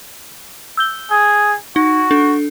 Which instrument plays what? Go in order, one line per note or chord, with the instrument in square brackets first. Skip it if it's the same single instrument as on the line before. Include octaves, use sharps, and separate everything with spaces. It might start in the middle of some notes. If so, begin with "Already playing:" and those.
[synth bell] E6 G6 G7
[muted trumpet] G#4
[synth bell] D#4 [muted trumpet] F#4
[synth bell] D4 A4